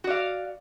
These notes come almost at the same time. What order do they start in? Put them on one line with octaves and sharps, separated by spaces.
F#4 D5 F5